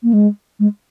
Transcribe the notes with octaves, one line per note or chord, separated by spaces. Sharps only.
A#3
G#3
G#3